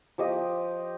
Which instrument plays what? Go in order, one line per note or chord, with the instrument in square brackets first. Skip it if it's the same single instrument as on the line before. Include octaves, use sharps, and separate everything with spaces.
[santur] F3 G4 D#5